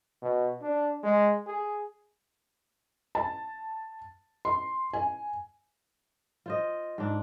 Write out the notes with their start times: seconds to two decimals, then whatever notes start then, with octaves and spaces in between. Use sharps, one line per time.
0.22 B2
0.62 D4
1.03 G#3
1.47 G#4
3.15 A5
4.45 C6
4.93 G#5
6.46 F4 C5 D#5
6.98 G#2 D4